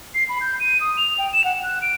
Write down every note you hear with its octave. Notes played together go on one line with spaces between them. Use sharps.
C7
B5
G6
D#7
D#6
F7
G5
E7
F#5
F#6
D7